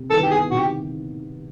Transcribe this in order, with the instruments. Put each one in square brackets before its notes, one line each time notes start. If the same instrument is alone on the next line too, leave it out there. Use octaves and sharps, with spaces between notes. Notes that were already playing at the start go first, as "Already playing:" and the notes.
Already playing: [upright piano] C3
[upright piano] D#3 G3 B3 E4 [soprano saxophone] A4
[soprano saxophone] G4
G#4
[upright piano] C3 [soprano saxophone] F#4
[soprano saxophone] G4